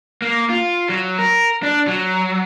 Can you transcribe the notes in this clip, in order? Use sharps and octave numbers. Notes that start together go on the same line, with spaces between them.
A#3
F4
F#3
A#4
D4
F#3